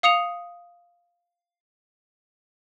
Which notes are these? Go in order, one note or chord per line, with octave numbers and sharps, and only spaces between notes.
F5 D#6 C#7 F7